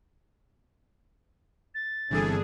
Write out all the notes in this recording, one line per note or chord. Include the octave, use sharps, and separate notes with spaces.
A6
G1 C3 E3 D4 G#4 A4